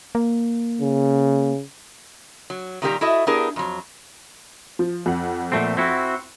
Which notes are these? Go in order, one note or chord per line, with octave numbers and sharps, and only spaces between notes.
A#3
C#3
F#3
A#2 D#3 G3 E4 G4 A#5
E4 F#4 A4 D#5 E5
B3 D4 E4 G4 G#4 A#4
F2 F#3
F3
F2 F#5
A#2 A3 C4
C4 E4 F#4